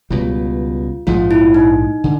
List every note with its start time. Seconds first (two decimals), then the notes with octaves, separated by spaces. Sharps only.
0.10 C#2 B2 G3 F4
1.07 A#1 G#2 F3 G#3 F4
1.31 E4
1.54 D#4
2.04 D3